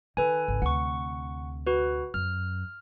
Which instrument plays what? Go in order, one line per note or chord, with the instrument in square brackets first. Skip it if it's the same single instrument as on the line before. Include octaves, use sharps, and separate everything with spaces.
[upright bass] D#3 [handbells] A4 B4 G#5
[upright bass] G#1 C#2
[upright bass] D2 C3 [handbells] F#5 C#6
[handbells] F#4 B4
[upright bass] F#2 [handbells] F6